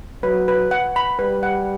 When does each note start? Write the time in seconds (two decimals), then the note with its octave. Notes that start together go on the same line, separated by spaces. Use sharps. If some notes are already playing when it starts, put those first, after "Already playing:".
0.23 F#3 B4
0.48 B4
0.71 F#5
0.96 B5
1.19 G3 B4
1.43 F#5